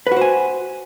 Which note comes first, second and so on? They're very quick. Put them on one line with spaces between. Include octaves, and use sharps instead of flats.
B4 F#4 C5 G#5